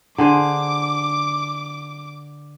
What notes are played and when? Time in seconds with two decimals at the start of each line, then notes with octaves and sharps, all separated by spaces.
0.18 D3 G#4 C5 D6